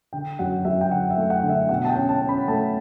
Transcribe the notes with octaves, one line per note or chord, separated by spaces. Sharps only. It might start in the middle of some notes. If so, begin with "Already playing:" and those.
D3 G5
F#2 F#5
F#2 E5
G5
D3 F#5
E5
A3
F#5
D3
E5
B2 F#5
A5
G5
C#4
A5
C#4
B5
A3 A5